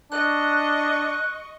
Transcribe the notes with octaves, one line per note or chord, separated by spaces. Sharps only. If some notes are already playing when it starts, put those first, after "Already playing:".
D4 D#5 C#6 F#6